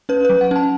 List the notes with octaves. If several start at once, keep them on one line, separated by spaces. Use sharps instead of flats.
C#4 B4
F#3 B4
F#5
C#4 A5